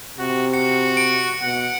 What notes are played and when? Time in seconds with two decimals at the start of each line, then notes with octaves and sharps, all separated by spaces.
0.19 C3 F#4
0.54 F#4 C#7
0.97 D7
1.42 B2 F#5